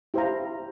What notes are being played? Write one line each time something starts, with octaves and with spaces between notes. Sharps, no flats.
E4 G4 C5 F5 A#5